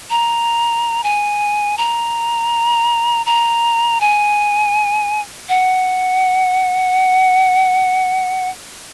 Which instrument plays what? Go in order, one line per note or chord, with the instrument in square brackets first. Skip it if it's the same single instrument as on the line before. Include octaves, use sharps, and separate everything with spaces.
[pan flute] A#5
G#5
A#5
A#5
G#5
F#5